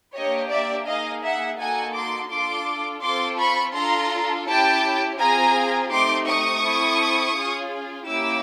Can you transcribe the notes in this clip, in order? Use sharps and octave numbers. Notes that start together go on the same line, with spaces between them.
A#3 D4 G4 C#5 D#5
D5 E5
A#3 D#4 G#4 D#5 F5
E5 F#5
A#3 D#4 F#4 A4 F#5 G#5
C6 D6
D4 F4 A4 C6 D6
C4 F4 A4 C6 D6
B5 C#6
D4 F4 A4 A#5 C6
C#4 E4 G4 G5 A5
C4 F4 G#4 G#5 A#5
A3 C4 D#4 G4 C6 D6
C#6 D#6
C4 E4 A4
C#4 F4 G#4
A#3 C#4 E4 G4 D6 E6